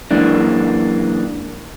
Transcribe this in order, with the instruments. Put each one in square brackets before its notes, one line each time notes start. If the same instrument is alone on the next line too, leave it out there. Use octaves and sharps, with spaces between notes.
[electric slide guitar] F#2 E3 G#3 A#3 D4